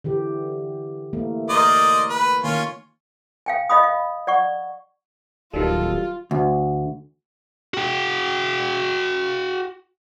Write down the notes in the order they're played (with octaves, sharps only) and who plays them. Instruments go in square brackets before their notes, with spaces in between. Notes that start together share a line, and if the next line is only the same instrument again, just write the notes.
[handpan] D3 E3 G4
E3 A3 A#3
[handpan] A#4 [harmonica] C5 D5 D#5
[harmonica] B4
[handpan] D#3 A#3 [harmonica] C#4 F4 C#5
[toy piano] F5 G5 G#5
D#5 F5 B5 D#6
F5
D5 F#5 C#6
[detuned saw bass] D1 [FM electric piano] D#3 F#3 G3 [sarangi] F4 [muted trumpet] A4
[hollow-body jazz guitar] D2
[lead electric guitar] F#4 G5